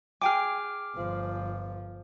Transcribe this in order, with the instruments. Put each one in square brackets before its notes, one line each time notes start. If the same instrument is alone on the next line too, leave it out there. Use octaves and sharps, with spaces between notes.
[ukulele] G#4 G5 G#5 [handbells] D6 F6
[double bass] G1 F3